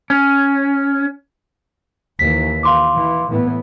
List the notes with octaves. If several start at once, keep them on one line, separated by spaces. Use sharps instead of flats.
C#4
D#2 E3 B6
F5 C6 D6
E3
A2 E3 B3